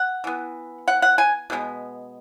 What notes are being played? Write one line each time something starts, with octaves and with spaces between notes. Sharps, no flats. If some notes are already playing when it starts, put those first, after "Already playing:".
Already playing: F#5
E3 B3
F#5
F#5
G#5
B2 G#3 B3